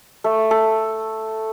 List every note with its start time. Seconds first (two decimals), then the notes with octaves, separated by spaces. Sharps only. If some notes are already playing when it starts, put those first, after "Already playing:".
0.24 A3
0.51 A4